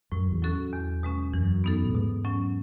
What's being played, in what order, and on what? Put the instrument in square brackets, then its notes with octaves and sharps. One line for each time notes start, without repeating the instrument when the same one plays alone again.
[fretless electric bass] F#2 [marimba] A2
[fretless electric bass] E2
[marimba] F#3 C#4 F#4 A4
E2
B2 G#3 C#4
[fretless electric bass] F#2 [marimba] E3
[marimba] B3 D#4 A4
[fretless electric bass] A2
[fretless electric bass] G#2 [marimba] B2
[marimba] F#3 C#4